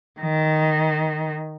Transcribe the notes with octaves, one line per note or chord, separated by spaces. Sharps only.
D#3